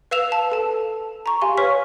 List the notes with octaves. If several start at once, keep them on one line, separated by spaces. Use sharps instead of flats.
B4 F5 E6 E7 F7
A5
A4 A5
A#5 C#6
G4 F5 G#5 C6
B4 C#5 C#6 F6 B6